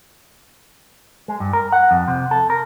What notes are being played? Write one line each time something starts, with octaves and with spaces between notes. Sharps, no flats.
G#3
G2
A#4
F#5
F2
C3
A4
A#4